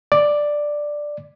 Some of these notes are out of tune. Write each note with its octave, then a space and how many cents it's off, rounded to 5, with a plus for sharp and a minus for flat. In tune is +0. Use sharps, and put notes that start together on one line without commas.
D5 +5